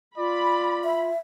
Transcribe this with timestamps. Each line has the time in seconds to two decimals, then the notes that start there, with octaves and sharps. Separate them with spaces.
0.18 F4 D5 B5
0.84 E5